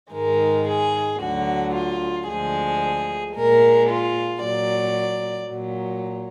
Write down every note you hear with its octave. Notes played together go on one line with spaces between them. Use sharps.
G#2 D#3 G#3 A#4
G#4
D2 D3 F#3 F#4
F4
D2 D3 F3 G#3 G#4
A#2 G#3 A#4
F4
A#2 F#3 D5
A#2 F#3